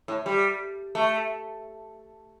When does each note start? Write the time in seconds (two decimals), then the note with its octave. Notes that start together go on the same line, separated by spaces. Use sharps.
0.08 A2
0.26 G3
0.95 A3